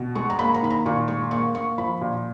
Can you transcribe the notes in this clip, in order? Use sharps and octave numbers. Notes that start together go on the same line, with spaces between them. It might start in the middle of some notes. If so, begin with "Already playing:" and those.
Already playing: B2
G#3 C#6
A#5
A#3 B5
A#5
D#3 B5
A#5
A#2 C#6
G#3 C#6
A#3 C#6
A#3 C#6
F3 B5
A#2